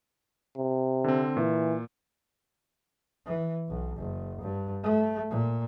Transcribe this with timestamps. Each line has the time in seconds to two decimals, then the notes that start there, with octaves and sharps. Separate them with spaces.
0.57 C3
1.04 D3 C4
1.37 A#2 E3
3.26 E3
3.69 B1
3.98 F#1
4.42 G2
4.83 A3
5.30 A#2